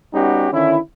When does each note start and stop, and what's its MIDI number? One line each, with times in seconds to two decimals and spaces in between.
0.13 0.48 55
0.13 0.48 59
0.13 0.48 61
0.13 0.48 63
0.13 0.48 66
0.13 0.48 67
0.52 0.78 50
0.52 0.78 51
0.52 0.78 61
0.52 0.78 64